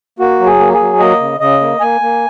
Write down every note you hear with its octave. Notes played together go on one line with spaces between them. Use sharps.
A#3 F#4
F#3
G#4
A#3
G#4
F#3
A#3 D#5
C#3
C#3 D#5
A#3
A#3 G#5
A#3